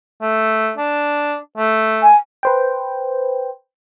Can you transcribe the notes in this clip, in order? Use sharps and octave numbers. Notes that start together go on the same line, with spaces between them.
A3
D4
A3
G#5
B4 C5 G5